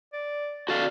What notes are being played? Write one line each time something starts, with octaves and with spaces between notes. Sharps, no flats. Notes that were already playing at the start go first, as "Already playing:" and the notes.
D5
F#4 A4 D5 F5